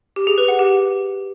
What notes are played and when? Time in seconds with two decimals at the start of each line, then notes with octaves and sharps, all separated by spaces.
0.16 G4
0.27 G#4
0.38 B4
0.48 F#5
0.59 G4